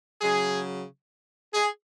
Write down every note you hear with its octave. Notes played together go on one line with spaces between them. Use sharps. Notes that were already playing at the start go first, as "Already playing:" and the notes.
C#3 F#3 G#4
G#4